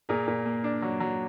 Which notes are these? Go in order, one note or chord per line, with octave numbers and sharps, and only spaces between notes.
A#2 G#4 A#4
A#2
A#3
D4
F#3
F#3